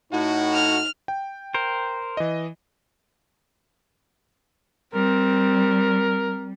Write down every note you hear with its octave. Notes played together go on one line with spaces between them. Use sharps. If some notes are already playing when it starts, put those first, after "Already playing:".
A2 D#4 F#4
F6
G5
A#4 C5
E3 D#5
G3 C4 A#4